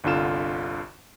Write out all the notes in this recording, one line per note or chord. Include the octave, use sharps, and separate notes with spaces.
G1 C2 D3 F4 E7